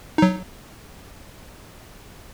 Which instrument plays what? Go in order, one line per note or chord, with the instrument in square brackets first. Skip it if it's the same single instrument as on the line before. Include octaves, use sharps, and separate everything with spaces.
[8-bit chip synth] F#3 D#4